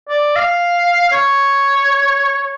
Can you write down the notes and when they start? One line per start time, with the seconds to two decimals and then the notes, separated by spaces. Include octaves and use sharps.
0.09 D5
0.36 F5
1.12 C#5